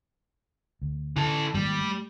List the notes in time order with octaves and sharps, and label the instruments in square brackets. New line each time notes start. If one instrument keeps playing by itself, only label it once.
[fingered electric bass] D2
[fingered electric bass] D3 [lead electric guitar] E3 A4
[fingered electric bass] G#2 D#3 A#3 [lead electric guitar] G3
[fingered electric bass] A3